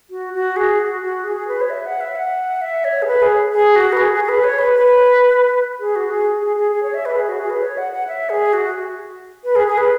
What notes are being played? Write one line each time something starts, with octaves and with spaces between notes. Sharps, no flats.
F#4
F#4
G#4
F#4
F#4
G#4
G#4
B4
C#5
E5
F#5
E5
F#5
E5
C#5
G#4
B4
G#4
G#4
F#4
B4
G#4
G#4
G#4
B4
C#5
B4
B4
G#4
F#4
G#4
G#4
G#4
G#4
C#5
E5
B4
G#4
F#4
G#4
B4
C#5
F#5
F#5
E5
G#4
F#4
B4
G#4
G#4
B4